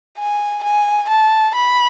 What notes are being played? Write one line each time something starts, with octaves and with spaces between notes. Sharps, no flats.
G#5
G#5
A5
B5